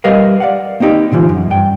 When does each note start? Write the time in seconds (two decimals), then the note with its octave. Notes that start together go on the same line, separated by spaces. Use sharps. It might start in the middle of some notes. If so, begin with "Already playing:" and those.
0.04 G3 G4 A#4 B4 D#5 F5
0.40 D5 F5 F#5
0.80 A#3 C4 D#4 G4
1.11 A#2 D3 E3 F3
1.29 F#2
1.50 G2 G5